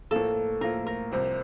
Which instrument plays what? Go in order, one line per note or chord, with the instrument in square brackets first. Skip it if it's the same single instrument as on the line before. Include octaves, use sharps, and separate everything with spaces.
[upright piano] A2 F3 A#3 F4 [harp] A4
[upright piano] A2 F3 A#3 F4 [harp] A#4
[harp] A#4
[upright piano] C2 C3 F3 C4